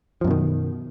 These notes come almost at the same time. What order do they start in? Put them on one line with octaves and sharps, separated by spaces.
F3 F#2 B2 D#3